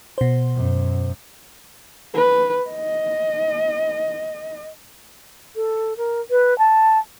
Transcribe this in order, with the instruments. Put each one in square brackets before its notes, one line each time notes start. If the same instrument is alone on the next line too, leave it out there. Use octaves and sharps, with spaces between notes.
[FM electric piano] B2 C5
[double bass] F#2
[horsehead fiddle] B4
D#5
[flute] A4
A#4
B4
A5